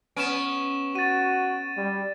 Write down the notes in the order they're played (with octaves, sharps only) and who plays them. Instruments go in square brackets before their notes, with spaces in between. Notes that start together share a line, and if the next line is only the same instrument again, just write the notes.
[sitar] B3 C#4 [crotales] D7 E7
[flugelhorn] F#4 [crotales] A6 D#7
[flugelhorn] G3